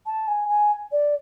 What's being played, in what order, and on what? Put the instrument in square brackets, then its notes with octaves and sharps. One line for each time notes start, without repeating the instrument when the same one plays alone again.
[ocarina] A5
G#5
G#5
D5